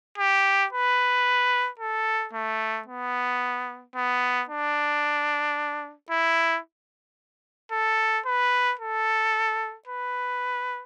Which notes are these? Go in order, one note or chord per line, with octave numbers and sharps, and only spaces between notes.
G4
B4
A4
A3
B3
B3
D4
E4
A4
B4
A4
B4